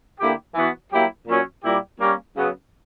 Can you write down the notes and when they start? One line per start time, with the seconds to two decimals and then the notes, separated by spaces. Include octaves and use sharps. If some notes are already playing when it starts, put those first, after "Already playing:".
0.19 D3 A#3 E4 G4
0.55 E3 B3 F#4
0.91 F#3 A#3 E4 G4
1.27 A#2 F#3 C#4
1.63 A#2 G3 A#3 E4 G4
1.99 G3 A#3 C#4
2.36 C#3 F#3 B3